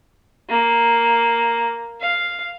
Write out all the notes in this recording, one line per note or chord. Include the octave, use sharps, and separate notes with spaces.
A#3
F5